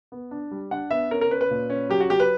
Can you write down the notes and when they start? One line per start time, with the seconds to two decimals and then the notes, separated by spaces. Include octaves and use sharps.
0.12 B3
0.31 D4
0.51 G3
0.71 D4 F#5
0.91 B3 E5
1.11 C#4 A#4
1.21 A#4
1.30 C#4 B4
1.41 B4
1.50 A#2
1.70 C#4
1.89 F#3 G4
2.00 F#4
2.10 F#3 G4
2.20 B4